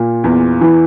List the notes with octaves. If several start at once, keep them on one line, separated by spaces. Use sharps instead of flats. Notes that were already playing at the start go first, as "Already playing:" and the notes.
Already playing: A#2
E2
E3